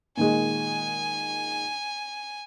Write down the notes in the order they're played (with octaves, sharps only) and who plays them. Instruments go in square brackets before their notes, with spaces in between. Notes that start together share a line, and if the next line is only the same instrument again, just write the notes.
[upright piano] A#2 D#3 G#3 [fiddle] G#5